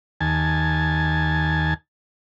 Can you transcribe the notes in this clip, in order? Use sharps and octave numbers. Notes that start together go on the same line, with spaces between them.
D#2 G#5 A5